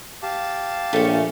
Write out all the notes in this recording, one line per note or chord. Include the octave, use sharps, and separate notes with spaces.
G4 F5 A5
A#1 A3 C#4